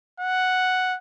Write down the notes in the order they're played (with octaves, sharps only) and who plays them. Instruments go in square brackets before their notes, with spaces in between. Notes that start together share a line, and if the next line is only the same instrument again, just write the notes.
[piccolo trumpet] F#5